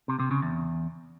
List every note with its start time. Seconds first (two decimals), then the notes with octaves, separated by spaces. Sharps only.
0.08 C3
0.20 C3
0.31 C#3
0.42 E2